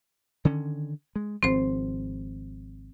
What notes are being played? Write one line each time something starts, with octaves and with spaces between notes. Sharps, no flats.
D3 D#3 C#4
G#3
G#1 F3 C4 C5